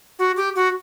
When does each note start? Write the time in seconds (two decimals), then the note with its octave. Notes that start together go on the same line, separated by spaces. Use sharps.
0.19 F#4
0.37 G4
0.56 F#4